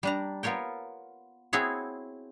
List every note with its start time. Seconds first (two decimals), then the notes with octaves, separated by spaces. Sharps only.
0.03 G3 D4 A#5
0.43 B3 F4 A#4 C#5 G5
1.53 C4 E4 F#4 G#4 C#5